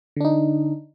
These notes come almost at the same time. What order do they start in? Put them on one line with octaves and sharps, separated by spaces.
D3 D4 D#4